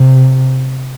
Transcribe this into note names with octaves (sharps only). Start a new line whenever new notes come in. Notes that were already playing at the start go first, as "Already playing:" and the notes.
Already playing: C3